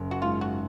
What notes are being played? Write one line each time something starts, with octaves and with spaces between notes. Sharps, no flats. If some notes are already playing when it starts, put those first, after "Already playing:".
Already playing: F#1
F#4
G#2 F4
F#4